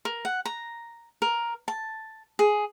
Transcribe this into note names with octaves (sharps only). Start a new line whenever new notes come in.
A#4
F#5
A#5
A#4
A5
G#4